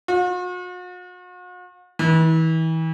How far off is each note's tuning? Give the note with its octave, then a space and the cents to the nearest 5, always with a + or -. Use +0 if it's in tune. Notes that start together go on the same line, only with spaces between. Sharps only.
F#4 -45
E3 -35